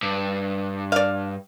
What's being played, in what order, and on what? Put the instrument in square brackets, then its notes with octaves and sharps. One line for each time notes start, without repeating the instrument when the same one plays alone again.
[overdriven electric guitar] G2
[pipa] D5 F5